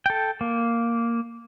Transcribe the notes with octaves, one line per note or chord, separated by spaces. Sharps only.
A4 G5
A#3